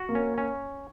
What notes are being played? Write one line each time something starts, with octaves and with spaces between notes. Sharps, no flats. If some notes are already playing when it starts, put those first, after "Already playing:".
Already playing: F#4
A#3
C#4
C#4